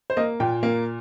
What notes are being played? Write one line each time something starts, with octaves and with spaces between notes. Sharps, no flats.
C5
A#3 D#5
A#2 G5
A#3